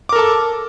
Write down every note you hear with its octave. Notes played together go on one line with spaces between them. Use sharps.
A4 A#4 A5 D6